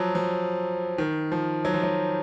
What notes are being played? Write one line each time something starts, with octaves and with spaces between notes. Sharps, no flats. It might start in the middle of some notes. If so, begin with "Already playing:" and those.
Already playing: F3 F#3
F3
D#3
F3
F#3
F3
F#3